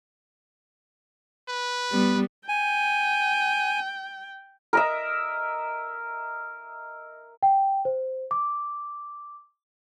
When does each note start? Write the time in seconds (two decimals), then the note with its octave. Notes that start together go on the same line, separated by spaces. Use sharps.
1.49 B4
1.92 G3 B3
2.48 G5 G#5
4.73 A#4 D#5 E5
7.43 G5
7.85 C5
8.31 D6